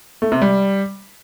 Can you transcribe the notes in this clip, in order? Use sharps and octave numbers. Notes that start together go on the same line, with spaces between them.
A3
C3
G3